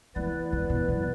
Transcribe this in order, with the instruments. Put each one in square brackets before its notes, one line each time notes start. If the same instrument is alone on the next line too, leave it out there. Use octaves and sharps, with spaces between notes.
[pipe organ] E3 B3 E4 B4 D5 [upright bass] A3
[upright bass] D3
B2
F#2